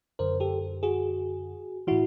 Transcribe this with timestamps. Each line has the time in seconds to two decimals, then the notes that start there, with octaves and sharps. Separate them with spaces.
0.19 F#2 D3 A#4 C5
0.40 G4 A4
0.83 F#4 G#4
1.87 A2 E3 E4 F#4